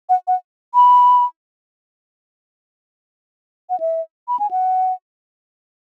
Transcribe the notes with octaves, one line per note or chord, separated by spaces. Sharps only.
F#5
F#5
B5
F#5
E5
B5
G#5
F#5